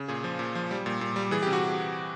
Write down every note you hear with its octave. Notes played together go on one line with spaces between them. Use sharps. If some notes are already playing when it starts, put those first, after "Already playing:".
Already playing: C#3
A#2 G#4
F3
A#2
F3
G3
A#2
A#2
G3
E3 G#4
C3 G4
F#4